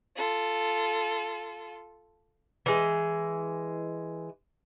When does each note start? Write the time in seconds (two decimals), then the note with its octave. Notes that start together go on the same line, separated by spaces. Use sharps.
0.16 F4 A4
2.66 E3 G#3